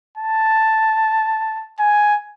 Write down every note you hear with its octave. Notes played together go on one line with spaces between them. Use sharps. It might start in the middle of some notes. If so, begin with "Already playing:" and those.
A5
G#5